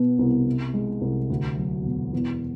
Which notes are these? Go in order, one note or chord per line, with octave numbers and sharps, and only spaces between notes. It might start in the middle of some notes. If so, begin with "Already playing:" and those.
Already playing: B2 B3
C2
C3
G#3
C2
D2
F#3
E1
E2